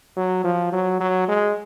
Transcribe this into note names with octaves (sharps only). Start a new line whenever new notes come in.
F#3
F3
F#3
F#3
G#3